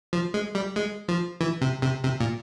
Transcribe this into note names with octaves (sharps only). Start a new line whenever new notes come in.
F3
G#3
G3
G#3
F3
E3
C3
C3
C3
A#2